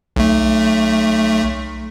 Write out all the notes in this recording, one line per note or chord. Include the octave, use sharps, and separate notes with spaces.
B1 A3